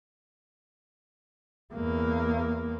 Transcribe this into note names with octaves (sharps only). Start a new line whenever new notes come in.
E2 A#3